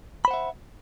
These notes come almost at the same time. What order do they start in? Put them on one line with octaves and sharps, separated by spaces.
B5 C5 F#5 E5